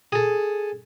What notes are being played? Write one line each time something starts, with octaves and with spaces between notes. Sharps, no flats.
G#4 A4